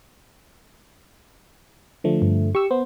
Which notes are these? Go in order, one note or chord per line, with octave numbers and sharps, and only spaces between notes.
D3 F3 A3
G2
G4 C#6 E6
B3 C5